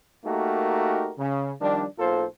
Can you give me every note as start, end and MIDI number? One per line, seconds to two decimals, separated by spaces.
0.25 1.11 57
0.25 1.11 58
0.25 1.11 63
0.25 1.11 66
0.25 1.11 67
0.25 1.11 70
1.18 1.52 49
1.60 1.84 51
1.60 1.84 53
1.60 1.84 55
1.60 1.84 62
1.99 2.24 35
1.99 2.24 58
1.99 2.24 65
1.99 2.24 69
1.99 2.24 72